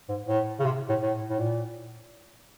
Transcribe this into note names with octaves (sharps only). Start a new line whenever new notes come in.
G#2
A2
C#3
C3
A2
A2
A2
A#2